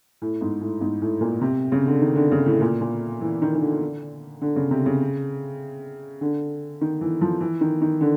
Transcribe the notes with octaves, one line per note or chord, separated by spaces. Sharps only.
A2
G#2
A2
G#2
A2
A#2
C3
C#3
D3
D#3
D3
C#3
A2
A#2
A#2
E3
D#3
D#3
D3
D3
C#3
C3
C#3
D3
D#3
E3
F3
E3
D#3
D#3
D3